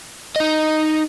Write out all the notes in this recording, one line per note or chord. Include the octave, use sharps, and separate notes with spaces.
D#4 D#5